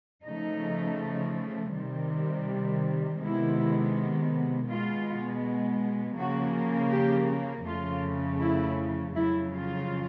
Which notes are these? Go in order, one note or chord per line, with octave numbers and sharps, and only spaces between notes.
C#3 F3 A3 D#4
C3 D#3 G3
C3 D#3 G#3 B3 E4
B2 G#3 B3 F4
C#3 F3 A#3 F#4
G4
F2 C#3 F3 A3 F4
E4
F2 C#3 F#3 E4
F4